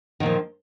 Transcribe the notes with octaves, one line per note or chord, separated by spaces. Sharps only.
A#2 D#3 F3